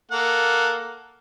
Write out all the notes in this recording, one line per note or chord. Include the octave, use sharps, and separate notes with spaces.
A#3 A4 F#5